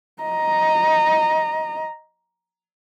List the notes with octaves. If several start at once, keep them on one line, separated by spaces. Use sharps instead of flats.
D#5 A#5